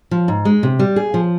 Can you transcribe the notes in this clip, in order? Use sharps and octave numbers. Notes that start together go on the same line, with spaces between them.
F3
G#2
G#3
C3
G3
G#4
F3